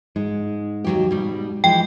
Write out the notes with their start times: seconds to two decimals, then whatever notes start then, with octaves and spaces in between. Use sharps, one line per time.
0.16 G#2 G#3
0.84 D#2 F#3 G4
1.11 B2 G3
1.64 E3 F3 G#3 G5